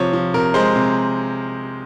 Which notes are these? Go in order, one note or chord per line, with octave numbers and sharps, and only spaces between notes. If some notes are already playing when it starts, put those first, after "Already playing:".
Already playing: C3 F3 C#5
F3
C3 A#4
G#3 C5
C3